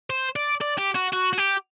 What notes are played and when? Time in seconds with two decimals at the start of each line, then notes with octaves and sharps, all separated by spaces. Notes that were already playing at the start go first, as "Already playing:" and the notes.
0.10 C5
0.36 D5
0.61 D5
0.78 G4
0.95 F#4
1.13 F#4
1.33 F#4
1.38 G4